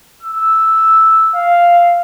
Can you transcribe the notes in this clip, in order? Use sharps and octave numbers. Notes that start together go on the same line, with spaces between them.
E6
F5